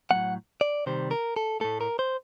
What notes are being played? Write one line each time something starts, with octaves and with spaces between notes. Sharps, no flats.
A2 F#3 A3 F#5
D5
C3 D#3 G3 C5
A#4
A4
A2 A3 A4
A#4
C5